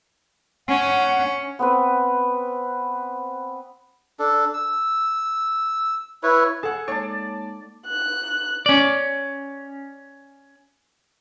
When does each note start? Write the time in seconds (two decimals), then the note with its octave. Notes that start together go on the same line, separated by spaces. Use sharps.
0.69 C#4 F#5
1.59 B3 C4 B4
4.19 D4 A4
4.54 E6
6.23 E4 B4 C#5
6.63 G#4 A4 F#5
6.88 G#3 A#3 D#4 C#5 D5 A5
7.87 F#6
8.66 C#4 D5